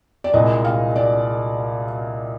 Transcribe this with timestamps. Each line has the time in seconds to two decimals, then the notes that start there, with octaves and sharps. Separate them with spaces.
0.24 D5
0.33 C2 A#2 G#3 D#5
0.65 F5
0.96 D5